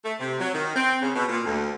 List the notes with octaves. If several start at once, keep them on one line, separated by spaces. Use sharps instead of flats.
A3
C3
F#3
D#3
C4
C#3
B2
A#2
D2